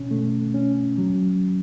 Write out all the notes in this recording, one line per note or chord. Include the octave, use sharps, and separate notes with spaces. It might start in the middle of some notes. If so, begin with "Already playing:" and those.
Already playing: B2 C#4
A3
C#4
F#3